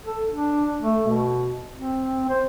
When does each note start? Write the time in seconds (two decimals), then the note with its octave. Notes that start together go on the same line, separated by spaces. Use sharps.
0.04 A4
0.30 D4
0.82 A3
1.07 B2
1.74 C4
2.29 C5